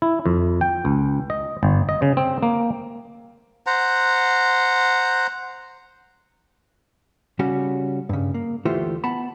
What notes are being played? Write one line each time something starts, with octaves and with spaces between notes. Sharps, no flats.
E4
F2
G5
C#2
D#5
G1
D#5
C#3
C4
A#3
C5 F#5 A#5
C#3 G3 C#4 F#4
G2 C#3
A#3
D2 E3 A3 F4 G4 C5
B3 A5 B5